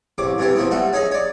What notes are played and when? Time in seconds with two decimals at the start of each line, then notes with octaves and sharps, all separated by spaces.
0.18 A1 C3 D6
0.38 G2 C3 E3 G4
0.56 C3 F3 A#3 B3
0.71 G3 A3 F#4
0.93 C#4 D#4 G#4 D#5
1.11 C#5 D5